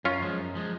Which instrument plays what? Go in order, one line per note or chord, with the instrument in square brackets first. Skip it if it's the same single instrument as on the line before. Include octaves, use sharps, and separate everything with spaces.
[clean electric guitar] F#2 [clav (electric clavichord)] C#4 F4
[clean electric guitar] F3 G#3
F#2
F3 G#3